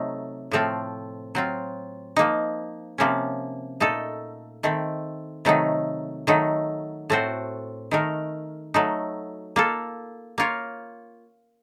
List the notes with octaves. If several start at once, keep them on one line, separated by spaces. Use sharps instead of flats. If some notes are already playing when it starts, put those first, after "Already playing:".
Already playing: C3 F#3 A3 D#4
A2 F3 A3 C4 F4
F#3 C4 F4
F3 A#3 D#4
C3 F3 A#3 C#4
A#2 A3 D#4 A4
D#3 A3 C4
C3 D#3 F#3 A3 D#4
D#3 F#3 A3 D#4
A2 A3 C4 F#4 C5
D#3 A3 D#4 A#4
F#3 A3 D#4
A#3 F4 A4
A#3 F4 A#4 C#5